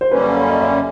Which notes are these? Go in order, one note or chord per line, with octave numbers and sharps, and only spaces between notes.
C5
F#2 D3 G3 A#3 C#4 B4 C#5
D#5
D5 E5